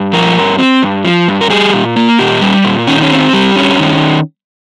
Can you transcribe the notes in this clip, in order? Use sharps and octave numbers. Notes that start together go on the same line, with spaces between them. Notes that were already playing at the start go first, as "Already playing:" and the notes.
Already playing: G2
F3 A#4
G2
C4
G2
F3
G2
A#4
G3 G#4
A#2
A#3
A#2 G4
G3
A#2
D#3 C#4
D#4
C#4
C4
G3
G2 C#4
D#3